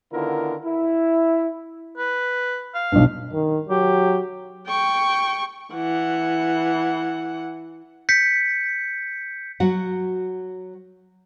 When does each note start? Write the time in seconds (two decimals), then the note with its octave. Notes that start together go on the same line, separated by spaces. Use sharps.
0.13 D3 D#3 B3 E4 F4 A#4
0.65 E4
1.98 B4
2.75 F5
2.92 B1 G2
3.33 D#3
3.69 F#3 G4
4.68 G5 C#6
5.74 E3 F#5
8.09 G6 B6 C#7
9.60 F#3 F#4 F#5